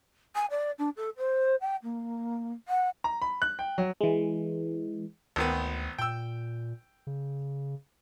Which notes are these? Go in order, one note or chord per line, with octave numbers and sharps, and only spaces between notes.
G#5
D5
D4
A4
C5
G5
A#3
F#5
A#5
B5
F#6
G5
F#3
E3 G#3
G#1 D2 D#3 B3
A#2 G5 E6
C#3